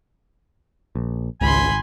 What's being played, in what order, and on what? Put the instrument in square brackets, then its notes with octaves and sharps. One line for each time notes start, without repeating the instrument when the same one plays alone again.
[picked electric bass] A#1
[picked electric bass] G#1 [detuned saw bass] C#2 [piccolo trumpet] G#5 [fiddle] B5 C6